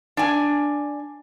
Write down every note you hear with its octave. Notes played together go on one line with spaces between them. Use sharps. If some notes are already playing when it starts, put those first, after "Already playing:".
D4 G#5